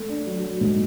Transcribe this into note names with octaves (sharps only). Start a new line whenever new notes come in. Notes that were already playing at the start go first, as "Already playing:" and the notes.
Already playing: A3
D4
F#3
F#3
G#2